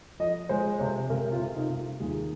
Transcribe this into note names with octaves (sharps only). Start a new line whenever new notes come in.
F3 D#5
G#3 C5
C3 C5
C3 A#4
F4
C3
D#4
C3
F4
D#2 G#4